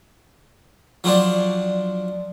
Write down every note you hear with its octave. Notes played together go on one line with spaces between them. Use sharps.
F3 F#3 C4 D4